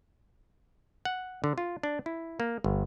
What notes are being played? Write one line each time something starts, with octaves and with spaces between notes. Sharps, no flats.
F#5
D3
F4
D4
E4
A#3
G1